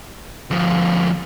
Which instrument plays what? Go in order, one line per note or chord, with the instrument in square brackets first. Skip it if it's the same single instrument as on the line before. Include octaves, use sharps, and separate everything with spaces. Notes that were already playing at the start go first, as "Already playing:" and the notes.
[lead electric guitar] D2 F3